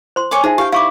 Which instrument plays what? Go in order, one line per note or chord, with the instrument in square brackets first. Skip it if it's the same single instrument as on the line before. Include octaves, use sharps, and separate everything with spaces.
[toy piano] C5 C6
[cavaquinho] C#5 G#5 D6
[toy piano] D#4 C5 E5 [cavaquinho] G#4
[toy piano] G4 [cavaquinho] F5 G5
[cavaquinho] E4 B5 [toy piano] F5 C#6 D6